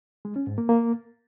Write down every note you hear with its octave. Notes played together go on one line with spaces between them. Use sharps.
G#3
C#4
G#2
A#3
A#3